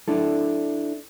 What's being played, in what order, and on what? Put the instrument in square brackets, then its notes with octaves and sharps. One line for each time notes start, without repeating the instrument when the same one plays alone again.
[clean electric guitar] D4 E4 A4